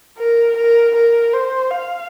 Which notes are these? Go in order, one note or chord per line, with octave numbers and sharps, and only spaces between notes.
A#4
A#4
A#4
C5
F5